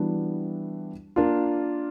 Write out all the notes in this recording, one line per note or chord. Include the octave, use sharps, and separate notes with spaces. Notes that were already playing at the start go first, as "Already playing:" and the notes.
Already playing: E3 G3 B3 D4 F#4
A#3 D4 F4